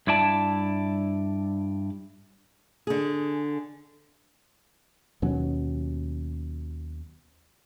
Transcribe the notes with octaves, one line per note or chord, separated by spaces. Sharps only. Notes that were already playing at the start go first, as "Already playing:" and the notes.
G2 E4 D5 A5
D3 G#4
D#2 B2 F#3 C#4